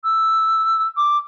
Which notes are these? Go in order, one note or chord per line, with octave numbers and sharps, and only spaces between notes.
E6
D6